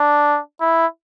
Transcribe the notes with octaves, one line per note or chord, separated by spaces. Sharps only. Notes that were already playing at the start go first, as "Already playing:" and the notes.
Already playing: D4
E4